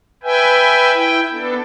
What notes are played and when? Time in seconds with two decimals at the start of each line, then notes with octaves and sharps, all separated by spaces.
0.23 B4 E5 G5 G#5
0.93 E4 G5
1.32 B3 D4 A4